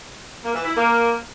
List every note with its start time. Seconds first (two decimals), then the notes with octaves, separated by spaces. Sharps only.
0.44 A#3
0.54 E3
0.65 E4
0.75 A#3